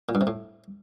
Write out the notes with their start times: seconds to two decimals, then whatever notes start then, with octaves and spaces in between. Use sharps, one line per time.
0.09 A#2
0.15 G2
0.21 C3
0.27 A2